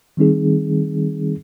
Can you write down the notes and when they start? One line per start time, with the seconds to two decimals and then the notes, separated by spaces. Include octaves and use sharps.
0.17 D#3 G3 C4 D#4 G#4